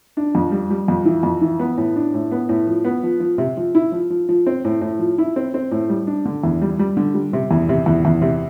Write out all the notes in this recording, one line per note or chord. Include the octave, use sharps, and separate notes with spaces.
D4
F2
G3
G3
F2
E3
F2
E3
B3
A2
D4
A2
B3
A2
F3
B3
F3
F3
C3
F3
E4
F3
F3
F3
C4
A2
A2
F3
E4
C4
C4
A2
G3
D4
D3
E2
G3
G3
D3
G3
C3
E2
C3
E2
E2
C3